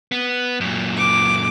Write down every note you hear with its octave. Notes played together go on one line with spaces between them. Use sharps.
B3
F#2 A#2
D6